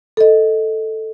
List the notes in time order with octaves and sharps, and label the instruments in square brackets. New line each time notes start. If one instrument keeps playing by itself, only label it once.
[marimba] A4 D#5